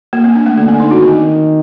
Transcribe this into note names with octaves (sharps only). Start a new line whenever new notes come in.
A#3
C4
D4
A3
D3 A#3
C4
D#4
F#4
D#3 C4